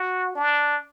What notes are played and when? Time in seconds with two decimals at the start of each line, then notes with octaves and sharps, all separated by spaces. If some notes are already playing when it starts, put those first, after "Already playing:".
Already playing: F#4
0.35 D4